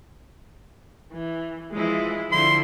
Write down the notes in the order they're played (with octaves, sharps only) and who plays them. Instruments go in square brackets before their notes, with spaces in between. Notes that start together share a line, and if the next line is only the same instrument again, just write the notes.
[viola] E3
[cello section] E3 F3 E4 [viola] G#3
[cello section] D3 E4 [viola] F3 [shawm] C6